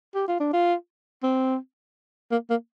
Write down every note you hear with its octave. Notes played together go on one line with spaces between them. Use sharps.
G4
F4
D4
F4
C4
A#3
A#3